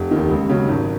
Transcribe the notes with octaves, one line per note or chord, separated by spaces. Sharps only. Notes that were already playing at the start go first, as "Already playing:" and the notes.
Already playing: F1
D#2 D#3
C#2
C#3 F#3
G#1